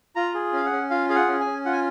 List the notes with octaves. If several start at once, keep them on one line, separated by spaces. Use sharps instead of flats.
F4 A#5
G#4
C#4 F5
F#5
C#4
F4 F5
G#4 F5
F#5
C#4
G#5
C#4
F4 F#5
G#5